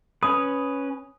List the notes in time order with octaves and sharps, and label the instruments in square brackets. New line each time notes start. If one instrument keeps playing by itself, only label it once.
[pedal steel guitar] C#4 B4 [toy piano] D#6